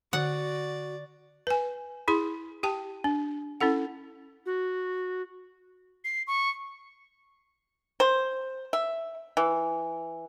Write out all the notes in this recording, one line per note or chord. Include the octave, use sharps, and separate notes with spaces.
D3 F#4 D5 F#5
B4 G#5
E4 G#4 C6
G4 G5 A5
D4
C#4 E4 A4 F#5
F#4
C7
C#6
C5
E5
E3